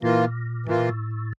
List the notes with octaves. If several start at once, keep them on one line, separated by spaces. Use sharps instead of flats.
A#2 E3 A#3 F4
A2 E3 A#3 F4
A#2
A2